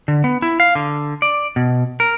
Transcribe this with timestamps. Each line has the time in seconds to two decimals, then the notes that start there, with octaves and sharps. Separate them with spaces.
0.08 D3
0.24 B3
0.42 E4
0.60 F5
0.75 D3
1.22 D5
1.56 B2
2.00 A#4